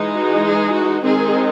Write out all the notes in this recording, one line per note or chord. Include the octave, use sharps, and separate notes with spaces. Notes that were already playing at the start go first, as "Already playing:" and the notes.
Already playing: E3 G#3 D#4
F#4
G#4
F#4
D#3 G#3 C4 D#4 G#4